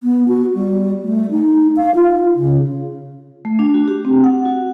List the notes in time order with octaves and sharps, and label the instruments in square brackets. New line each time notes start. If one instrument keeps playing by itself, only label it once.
[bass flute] B3
F#4
G3
A3
D#4
F5
F4
C#3
[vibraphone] A3
D4
F#4
G4
C4
F#5
F#4